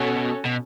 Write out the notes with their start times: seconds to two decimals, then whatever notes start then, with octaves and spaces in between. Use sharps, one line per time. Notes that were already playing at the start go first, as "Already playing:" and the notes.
Already playing: B2 C#4 F#4 A4 C#5
0.45 B2